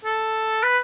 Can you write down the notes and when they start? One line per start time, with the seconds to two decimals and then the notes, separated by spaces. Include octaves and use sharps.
0.05 A4
0.63 B4